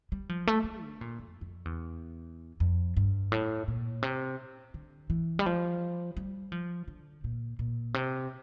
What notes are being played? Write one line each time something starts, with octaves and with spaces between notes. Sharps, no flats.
G3
F3
A3
A3
D3
A#2
F2
F2
E2
F2
G2
A2
A#2
C3
D3
E3
G3
F3
G3
F3
D3
A#2
A#2
C3